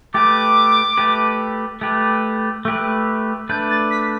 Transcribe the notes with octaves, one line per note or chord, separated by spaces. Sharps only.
A3 G4 B4 D6
A3 G4 B4
A3 G4 B4
A3 G4 B4
A3 D4 B4 G6
A6
B6